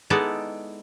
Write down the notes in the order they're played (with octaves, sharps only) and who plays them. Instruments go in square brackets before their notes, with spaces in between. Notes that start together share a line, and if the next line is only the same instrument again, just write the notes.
[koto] G#3 B3 D#4 E4 A4 D5